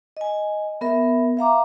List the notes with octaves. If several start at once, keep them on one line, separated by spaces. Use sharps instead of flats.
D#5 G#5
B3 A#4 E5
E5 F5 A#5 D6